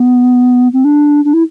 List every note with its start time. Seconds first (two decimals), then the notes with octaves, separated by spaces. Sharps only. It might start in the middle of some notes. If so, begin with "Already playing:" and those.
Already playing: B3
0.73 C4
0.84 D4
1.25 D4
1.34 E4